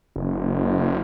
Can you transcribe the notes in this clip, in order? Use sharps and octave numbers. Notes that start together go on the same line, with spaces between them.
F#1